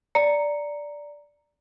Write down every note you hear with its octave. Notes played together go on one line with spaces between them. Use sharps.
D5 A#5 C#7